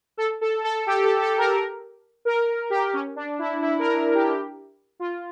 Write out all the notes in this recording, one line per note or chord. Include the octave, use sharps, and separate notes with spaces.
A4
A4
A4
G4
A4
A4
A#4
A#4
G4
C#4
D4
E4
E4
A#4
G4
F4